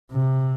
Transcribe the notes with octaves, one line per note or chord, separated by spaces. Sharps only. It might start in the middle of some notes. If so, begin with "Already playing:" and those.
C3